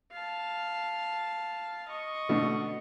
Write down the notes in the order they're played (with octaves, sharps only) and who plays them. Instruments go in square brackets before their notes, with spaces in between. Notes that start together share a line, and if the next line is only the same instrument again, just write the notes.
[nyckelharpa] F5 A5
D#5 C#6
[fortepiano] B2 D3 A3